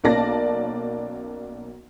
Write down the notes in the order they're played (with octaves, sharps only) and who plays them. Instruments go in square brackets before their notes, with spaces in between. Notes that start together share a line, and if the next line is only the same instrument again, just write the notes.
[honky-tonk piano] B1 A#3 C#4 D5 A5 A#6